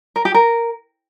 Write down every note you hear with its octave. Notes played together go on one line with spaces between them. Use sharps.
A#4
G4
A#4